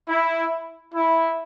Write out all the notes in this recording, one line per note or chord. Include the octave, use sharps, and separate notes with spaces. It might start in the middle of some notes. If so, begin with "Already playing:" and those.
E4
E4